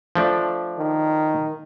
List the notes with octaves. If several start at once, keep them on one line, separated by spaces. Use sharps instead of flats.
F3 A3 D4
D#3